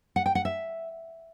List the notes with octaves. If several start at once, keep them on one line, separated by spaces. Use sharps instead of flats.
F#5
G5
F#5
E5